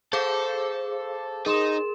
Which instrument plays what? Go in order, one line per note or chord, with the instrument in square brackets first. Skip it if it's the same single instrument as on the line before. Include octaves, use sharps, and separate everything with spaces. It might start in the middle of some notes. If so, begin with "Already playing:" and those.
[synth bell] G#4 F5 D6 [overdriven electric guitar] A4 [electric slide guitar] C5
[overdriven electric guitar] D#4 [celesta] G#4 C6 E7 [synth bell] A#4